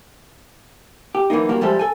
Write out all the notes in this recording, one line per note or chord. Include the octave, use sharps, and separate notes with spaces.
G4
F#2 E3 F3 A#3 D#4
G2 A#3 F#4 G4 A#4
F3 G3 G#3 A4 E5
A4 G#5